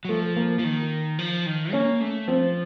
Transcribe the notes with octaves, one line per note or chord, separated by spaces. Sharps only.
F#3
F3 A3
A#3
F3
D#3
F3
D#3
A#3 C#4
A3
F3 C4